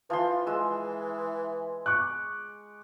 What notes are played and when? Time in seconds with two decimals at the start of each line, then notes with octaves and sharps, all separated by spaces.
0.10 E3 F3 C6
0.47 G#3 E6
1.86 C#6 D6 F#6